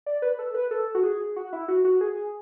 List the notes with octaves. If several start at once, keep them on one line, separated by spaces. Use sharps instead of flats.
D5
B4
A4
B4
A4
F#4
G#4
F#4
E4
F#4
F#4
G#4